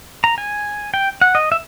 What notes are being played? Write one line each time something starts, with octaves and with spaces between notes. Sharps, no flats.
A#5
G#5
G5
F#5
D#5
E5